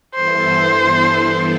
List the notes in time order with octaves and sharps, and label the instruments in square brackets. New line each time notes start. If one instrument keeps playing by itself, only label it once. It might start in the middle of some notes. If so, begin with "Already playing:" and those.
[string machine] G2 E3 B3 E4 A4 [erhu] C5